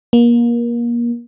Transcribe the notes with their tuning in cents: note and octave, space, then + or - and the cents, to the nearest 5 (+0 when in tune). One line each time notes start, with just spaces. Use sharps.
A#3 +30